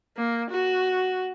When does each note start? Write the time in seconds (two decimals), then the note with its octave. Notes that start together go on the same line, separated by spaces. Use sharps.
0.17 A#3
0.51 F#4